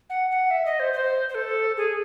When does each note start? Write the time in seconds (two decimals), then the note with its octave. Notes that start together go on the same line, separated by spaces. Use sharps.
0.10 F#5
0.31 F#5
0.51 E5
0.66 D#5
0.80 C5
0.93 C5
1.29 C5
1.35 A4
1.77 G#4